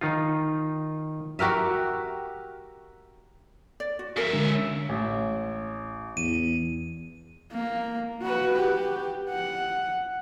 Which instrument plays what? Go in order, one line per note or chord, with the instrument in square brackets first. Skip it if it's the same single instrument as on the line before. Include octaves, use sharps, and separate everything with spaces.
[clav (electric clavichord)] D#3 D#4 F4
[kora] F#4 G4 A#4 E5
[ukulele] D5
F#4
[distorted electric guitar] C#3 E5 [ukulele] F#4 A#4
[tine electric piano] D3 G#3 D4
[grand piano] A1
[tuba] E2 [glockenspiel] D#7
[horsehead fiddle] A#3
F#4 B4
G4
F#5